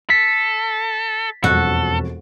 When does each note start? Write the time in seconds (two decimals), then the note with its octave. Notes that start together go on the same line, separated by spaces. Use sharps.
0.10 A4 B6
1.44 E1 F2 F#4 A4